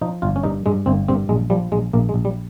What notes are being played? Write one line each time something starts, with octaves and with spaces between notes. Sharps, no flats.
F3 D#4
G1 F4
C#4
G2 D#4
G2 G#3
G1 C4
G2 C4
A#1 G#3
F3 G3
A#1 G#3
A#1 A#3
G#3
A#1
G3